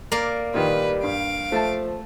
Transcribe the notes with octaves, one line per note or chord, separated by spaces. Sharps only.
A#3 A#4 D5
A#2 D#3 G3 B4
G2 F5 D7
F3 A3 A5